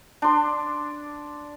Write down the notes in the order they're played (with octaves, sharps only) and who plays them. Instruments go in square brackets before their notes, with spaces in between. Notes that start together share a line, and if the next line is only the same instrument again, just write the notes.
[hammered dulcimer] D4 C6